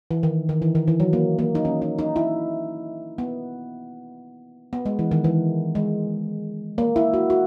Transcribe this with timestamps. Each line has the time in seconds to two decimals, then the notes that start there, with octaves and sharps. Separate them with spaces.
0.11 E3
0.23 D#3
0.49 D#3
0.62 E3
0.75 D#3
0.88 E3
1.00 F#3
1.13 A#3
1.39 A#3
1.55 D#4
1.65 C#4
1.82 D#4
1.99 D#4
2.16 E4
3.18 B3
4.73 B3
4.86 G#3
4.99 E3
5.11 D#3
5.24 E3
5.75 G#3
6.78 A#3
6.96 E4
7.13 F#4
7.30 F#4